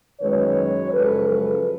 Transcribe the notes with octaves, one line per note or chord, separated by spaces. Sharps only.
F#2 D#3 G#3 B4 C#5
F#2 C#3 F3 G#3 A4 B4
A4 B4